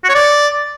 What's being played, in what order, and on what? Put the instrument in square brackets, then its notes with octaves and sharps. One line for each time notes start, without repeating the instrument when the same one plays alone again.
[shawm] F#4
C#5
D5